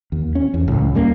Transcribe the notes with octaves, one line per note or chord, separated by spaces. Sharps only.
D#2
C#4
E2
C#2 A2
D#2 G3 A#3 C#4